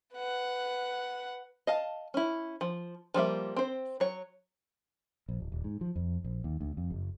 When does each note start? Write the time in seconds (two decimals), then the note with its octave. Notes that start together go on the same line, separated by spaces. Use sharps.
0.14 B4 F#5
1.67 D#5 F5 A5
2.14 C#4 E4
2.61 F3
3.14 F3 G3 A#3 E5
3.56 C4 C5
4.00 F#3 C#5
5.29 A#1
5.40 D1
5.52 D#1
5.64 G#2
5.81 F3
5.96 F2
6.24 A#1
6.44 D#2
6.60 D2
6.77 F2
6.90 F#1